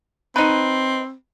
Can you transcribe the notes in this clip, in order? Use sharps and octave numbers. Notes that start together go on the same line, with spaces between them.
C4 D#4 B4